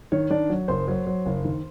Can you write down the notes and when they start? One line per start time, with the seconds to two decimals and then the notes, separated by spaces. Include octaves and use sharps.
0.12 D#3 C#5
0.30 D#3 D4 D5
0.50 F#3
0.68 F#1 C5 C6
0.88 F#3
1.07 F#3
1.26 F#1
1.45 D#3